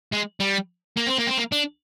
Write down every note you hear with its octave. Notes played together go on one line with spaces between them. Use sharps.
G#3
G3
A#3
C4
A#3
C4
A#3
D4